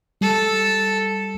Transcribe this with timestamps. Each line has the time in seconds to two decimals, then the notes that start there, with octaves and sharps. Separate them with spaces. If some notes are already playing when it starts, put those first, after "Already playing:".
0.21 G3 A4